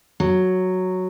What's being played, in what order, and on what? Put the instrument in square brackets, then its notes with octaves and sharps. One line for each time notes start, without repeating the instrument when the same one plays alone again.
[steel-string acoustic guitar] F#3